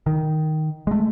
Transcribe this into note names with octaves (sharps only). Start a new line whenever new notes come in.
D#3
G#3 A3